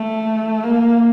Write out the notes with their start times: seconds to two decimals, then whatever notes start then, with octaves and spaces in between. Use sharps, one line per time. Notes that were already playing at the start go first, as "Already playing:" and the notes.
Already playing: A3
0.63 A#3